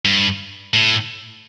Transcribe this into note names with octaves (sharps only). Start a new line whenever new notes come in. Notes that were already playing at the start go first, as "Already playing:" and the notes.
G2
A2